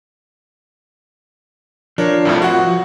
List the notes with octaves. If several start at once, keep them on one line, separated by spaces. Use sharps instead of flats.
F3 D4 A#4 C#5
C2 F2 A2
F#4 F#5